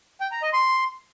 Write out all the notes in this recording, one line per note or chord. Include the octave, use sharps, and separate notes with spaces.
G5
A#5
D#5
C6